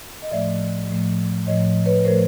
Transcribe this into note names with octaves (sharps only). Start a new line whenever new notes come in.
D#5
A2 F3 A3 D5 E5
A2 F3 A3
A2 F3 A3 C#5 D#5
B4 C#5
A2 F3 A3 A#4 C5